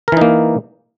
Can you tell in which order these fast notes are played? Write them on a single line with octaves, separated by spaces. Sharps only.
A#4 E3 D#4 A#3